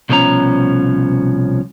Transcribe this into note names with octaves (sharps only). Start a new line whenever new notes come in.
C2 B2 F3 C#4 A#5